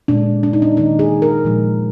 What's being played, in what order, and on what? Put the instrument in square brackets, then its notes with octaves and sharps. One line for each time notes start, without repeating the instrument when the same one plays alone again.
[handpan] A#2 G#3 D4
D4
D#4
D4
D#3 A#3 D#4
G#4
A#4
A#2 F3 G#3